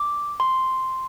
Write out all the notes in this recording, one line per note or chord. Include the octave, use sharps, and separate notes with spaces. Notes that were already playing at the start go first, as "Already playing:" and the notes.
Already playing: D6
C6